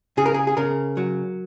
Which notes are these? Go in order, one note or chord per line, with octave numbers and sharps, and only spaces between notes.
C#3 G#4
A#4
G#4
G#4
C#3 A#4
F#3